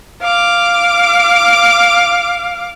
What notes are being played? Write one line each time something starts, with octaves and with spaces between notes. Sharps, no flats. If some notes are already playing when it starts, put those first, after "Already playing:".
F5 D6